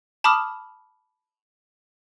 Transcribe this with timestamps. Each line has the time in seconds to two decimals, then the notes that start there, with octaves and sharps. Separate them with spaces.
0.24 A5 B5 D6 D#6 F6